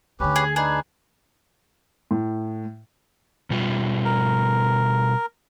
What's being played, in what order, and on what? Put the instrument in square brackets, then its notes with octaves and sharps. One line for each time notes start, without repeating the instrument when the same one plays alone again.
[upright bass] D2 D3 [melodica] C#4 G4 B4
[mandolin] G#4
[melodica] D4 D#4 B4 [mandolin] G#4
[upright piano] A2
[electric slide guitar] B2 G3 F4
[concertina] A#4